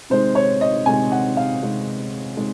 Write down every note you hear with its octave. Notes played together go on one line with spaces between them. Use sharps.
C3 D#3 G#3 C5
C#5
D#5
C3 D#3 G#3 G#5
F#5
F5
C3 D#3 G#3
C3 D#3 G#3